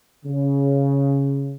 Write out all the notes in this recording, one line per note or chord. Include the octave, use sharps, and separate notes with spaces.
C#3